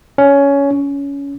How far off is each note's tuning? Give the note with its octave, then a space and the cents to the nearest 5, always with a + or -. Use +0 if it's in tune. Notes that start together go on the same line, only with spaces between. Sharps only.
C#4 +15
C#4 +20